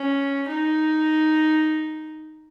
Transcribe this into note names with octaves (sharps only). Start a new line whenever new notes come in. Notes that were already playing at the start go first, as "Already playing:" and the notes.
Already playing: C#4
D#4